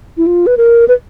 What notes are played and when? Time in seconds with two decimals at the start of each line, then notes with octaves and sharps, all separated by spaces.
0.17 E4
0.27 F4
0.47 B4
0.57 A#4
0.88 B4